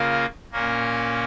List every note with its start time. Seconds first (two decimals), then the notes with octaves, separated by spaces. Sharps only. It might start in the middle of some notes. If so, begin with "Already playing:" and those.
Already playing: C#3 A#3 F4 A#4
0.52 A#2 A#3 C#4 A#4